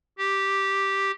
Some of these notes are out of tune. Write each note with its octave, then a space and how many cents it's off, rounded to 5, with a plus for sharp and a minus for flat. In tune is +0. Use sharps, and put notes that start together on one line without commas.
G4 -5